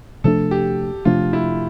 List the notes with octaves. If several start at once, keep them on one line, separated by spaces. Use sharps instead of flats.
C3 F3 A3 D4 A4
G4
C3 F3 A3 D4 F4
E4